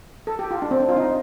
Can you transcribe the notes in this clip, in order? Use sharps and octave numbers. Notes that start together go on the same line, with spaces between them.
A4
G4
F4
D4
C4
D4
F4
D#4